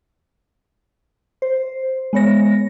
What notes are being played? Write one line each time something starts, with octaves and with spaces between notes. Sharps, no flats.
C5
G#3 B3 C#5 A#6